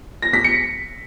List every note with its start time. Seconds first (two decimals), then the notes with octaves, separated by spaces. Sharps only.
0.22 A#6
0.33 B6
0.44 C#7